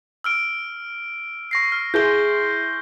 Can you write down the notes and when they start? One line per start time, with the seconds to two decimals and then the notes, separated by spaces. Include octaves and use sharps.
0.24 E6 F6 D7
1.51 C#6 A#6 C7
1.72 F6
1.94 E4 G#4 C6 G6 G7